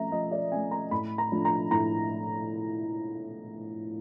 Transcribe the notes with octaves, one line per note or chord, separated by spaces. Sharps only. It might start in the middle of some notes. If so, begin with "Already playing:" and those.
Already playing: F3 A3 C#4 E5 A#5
F3 D#5
D5
A3 C#4 G#5
A#5
A2 B5
A#5
F3 A3 D4
A#5
A2 A#5